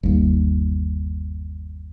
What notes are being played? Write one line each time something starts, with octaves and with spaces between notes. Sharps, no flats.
G1 D#2